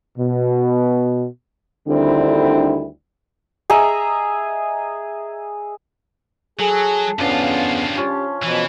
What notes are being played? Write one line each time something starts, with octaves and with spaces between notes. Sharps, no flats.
B2
D2 D3 D#3 G3 C4 E4
G#4 D#5 E5 A#5
F#3 G#4 A4
E2 G2 C#3 F3 B3 C#4 D4 F4
C#4 G4 C6
B2 E3 F3